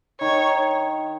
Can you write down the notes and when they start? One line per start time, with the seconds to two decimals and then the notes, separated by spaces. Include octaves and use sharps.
0.20 D#3 C#5